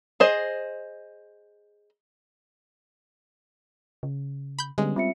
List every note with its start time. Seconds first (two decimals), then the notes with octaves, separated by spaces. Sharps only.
0.20 G#4 C5 D#5
4.03 C#3
4.59 B5 G6
4.78 D3 G3 G#3 B3 C#4
4.96 C4 F4 E5 C#7